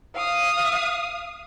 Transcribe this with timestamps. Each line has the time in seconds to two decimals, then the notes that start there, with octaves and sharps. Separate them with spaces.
0.15 F5 D#6